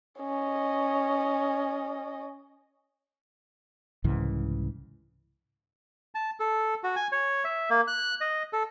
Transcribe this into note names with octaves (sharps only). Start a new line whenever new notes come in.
C#4 D#5
C2 G#2 C#3 E3
A5
A4
F#4
G#5
C#5
E5
A#3
F#6
D#5
A4